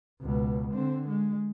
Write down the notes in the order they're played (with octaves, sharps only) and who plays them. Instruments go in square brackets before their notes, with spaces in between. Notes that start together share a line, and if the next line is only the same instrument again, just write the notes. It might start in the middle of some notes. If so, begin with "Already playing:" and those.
[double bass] C#2 B2
D3 C4
G#3